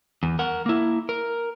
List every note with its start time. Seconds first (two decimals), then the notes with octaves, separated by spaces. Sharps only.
0.23 E2
0.39 A#4 F#5
0.66 A#3 E4
1.09 A#4